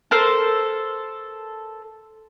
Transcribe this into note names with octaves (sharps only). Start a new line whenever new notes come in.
A4 A#4 C5